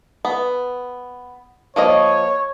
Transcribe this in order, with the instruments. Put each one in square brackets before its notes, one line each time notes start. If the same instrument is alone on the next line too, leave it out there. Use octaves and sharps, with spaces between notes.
[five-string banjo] B3
[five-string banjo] F3 A#3 D#5 [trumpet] C#5